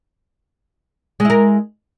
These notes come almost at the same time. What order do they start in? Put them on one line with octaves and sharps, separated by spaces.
G#3 E4 A#4